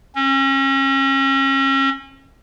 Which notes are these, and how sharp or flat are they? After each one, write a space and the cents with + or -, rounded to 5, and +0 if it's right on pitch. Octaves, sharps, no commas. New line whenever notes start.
C#4 -35